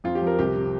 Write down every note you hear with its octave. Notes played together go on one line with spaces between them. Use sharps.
F2 F4
G4
F3
A#4
C2 G4
C3